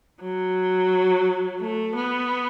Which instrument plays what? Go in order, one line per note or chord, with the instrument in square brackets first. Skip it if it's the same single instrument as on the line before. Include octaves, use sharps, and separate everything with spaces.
[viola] F#3
A3
B3